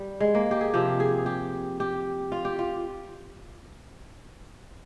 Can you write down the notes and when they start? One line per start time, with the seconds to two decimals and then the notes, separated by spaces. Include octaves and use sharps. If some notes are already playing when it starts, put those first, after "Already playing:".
Already playing: G3
0.20 G#3
0.35 A#3
0.51 G4
0.61 G#4
0.74 C3 F3 G4
1.00 G#4
1.26 G4
1.80 G4
2.32 F4
2.45 G4
2.59 F4